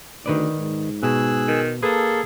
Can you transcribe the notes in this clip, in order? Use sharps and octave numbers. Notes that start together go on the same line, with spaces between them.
D2 D#3 B4 D5
G#2
B2 G#4 E6 F#6
D#3
A#3 G#4 A4 B4 A5